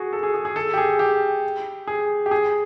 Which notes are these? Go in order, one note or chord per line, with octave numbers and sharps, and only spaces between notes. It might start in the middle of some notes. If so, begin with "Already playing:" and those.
Already playing: F#4 G#4
A4
G#4
G#4
G#4
A4
G4
G#4
G4
G#4
G4
G#4